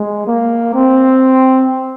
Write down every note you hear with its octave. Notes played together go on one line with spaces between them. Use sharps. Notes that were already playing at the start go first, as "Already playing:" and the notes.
Already playing: G#3
A#3
C4